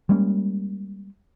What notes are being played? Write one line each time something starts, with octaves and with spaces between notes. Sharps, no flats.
G3 G#3 A#3 C#4